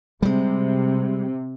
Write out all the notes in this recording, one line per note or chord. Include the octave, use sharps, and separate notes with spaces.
C3 G3 G#3